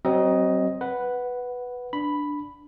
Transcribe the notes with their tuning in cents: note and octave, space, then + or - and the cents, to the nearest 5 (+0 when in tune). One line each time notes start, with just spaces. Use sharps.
F#3 +35 C4 +10 D#5 +5
B4 +0 F#5 +0
D4 +0 B5 +0